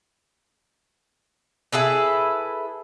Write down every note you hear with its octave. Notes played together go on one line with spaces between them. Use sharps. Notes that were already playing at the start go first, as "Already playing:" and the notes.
E4 G#4 A4 B4